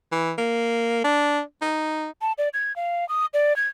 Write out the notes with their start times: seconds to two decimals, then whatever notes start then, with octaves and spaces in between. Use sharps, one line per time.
0.12 E3
0.38 A#3
1.04 D4
1.62 D#4
2.22 A5
2.38 D5
2.54 G#6
2.76 F5
3.09 D#6
3.34 D5
3.56 G#6